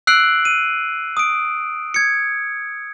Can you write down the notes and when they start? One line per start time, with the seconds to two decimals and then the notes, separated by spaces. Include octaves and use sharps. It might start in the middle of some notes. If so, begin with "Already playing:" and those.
0.07 E6 F#6 C7 D7 F#7
0.45 D#7
1.17 D#6 D7
1.94 G#6 C#7